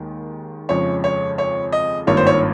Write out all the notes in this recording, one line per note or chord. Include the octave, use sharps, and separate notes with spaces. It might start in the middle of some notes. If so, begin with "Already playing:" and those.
Already playing: D#2 D#3 G#3
F2 C#3 F3 G#3 C#5
C#5
C#5
D#5
G#1 G2 D#3 A#3 F4 C#5
C5
C#5